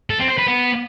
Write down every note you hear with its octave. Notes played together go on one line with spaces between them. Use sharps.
A4
C4
C5
B4
B3